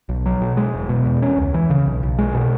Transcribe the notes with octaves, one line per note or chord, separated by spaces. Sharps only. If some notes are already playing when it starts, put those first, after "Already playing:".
B1
F#3
B2
G#3
E1
B2
E2
C#4
C#2
E3
C#3
B1
B1
G#3
B2